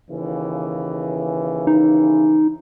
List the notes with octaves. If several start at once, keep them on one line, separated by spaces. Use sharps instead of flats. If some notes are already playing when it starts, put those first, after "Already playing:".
D#2 C#3 E3
D#4